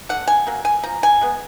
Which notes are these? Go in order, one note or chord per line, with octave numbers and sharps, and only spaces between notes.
D3 F#5
G#5
F#3 A#3
G#5
F3 A#5
G#5
G#3 B3